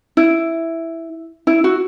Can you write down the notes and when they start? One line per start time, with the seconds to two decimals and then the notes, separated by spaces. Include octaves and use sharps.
0.17 E4
1.47 E4
1.64 F#4